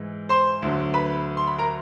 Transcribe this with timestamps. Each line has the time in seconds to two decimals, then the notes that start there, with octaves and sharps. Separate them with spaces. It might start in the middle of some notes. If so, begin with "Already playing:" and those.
Already playing: G#2 E3
0.29 C5 C6
0.62 D2 D3 F#3
0.94 B4 B5
1.37 C6
1.47 B5
1.58 A#4 A#5